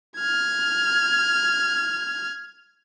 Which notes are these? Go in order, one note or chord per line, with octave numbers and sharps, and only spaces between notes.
F6 G#6